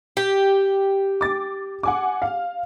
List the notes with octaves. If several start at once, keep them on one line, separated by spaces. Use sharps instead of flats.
G4
D6 A6
F#5 G#5 D6
F5